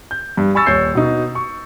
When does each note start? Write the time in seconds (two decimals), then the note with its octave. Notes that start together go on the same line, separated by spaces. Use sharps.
0.11 G6
0.37 G2
0.55 G#5 B5 C#6 E6 A6
0.66 D#1 C#5 G6 C7
0.95 B2 D#4
1.35 C#6